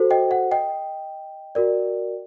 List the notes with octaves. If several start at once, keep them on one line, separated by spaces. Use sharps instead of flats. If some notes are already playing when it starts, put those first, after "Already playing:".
Already playing: F#4 A4 C5
D#5 G5
F#5
D#5 G5
F#4 A#4 D5